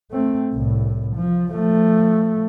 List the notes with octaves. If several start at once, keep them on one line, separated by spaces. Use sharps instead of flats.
A3 C4
C2 A2
F3
F3 A3